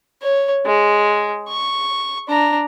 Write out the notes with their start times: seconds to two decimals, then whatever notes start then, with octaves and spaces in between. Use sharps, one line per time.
0.22 C#5
0.66 G#3
1.49 C#6
2.28 D4 A#5